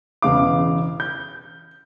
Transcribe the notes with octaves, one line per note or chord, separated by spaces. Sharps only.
E1 E2 C#3 F5 D6
G6